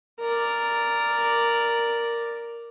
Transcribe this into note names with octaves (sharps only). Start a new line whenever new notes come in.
A#4 D5